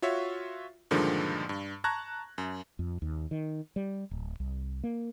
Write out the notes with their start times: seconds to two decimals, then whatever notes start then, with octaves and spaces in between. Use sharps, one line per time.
0.02 F4 F#4 C#5 E5
0.91 G2 A#2 D3 D#3 F3 G#3
1.49 G2
1.84 A5 A#5 C#6 F#6 G#6 A#6
2.38 F#2
2.79 F2
3.02 D#2
3.31 D#3
3.76 G3
4.11 D1
4.40 C2
4.84 A#3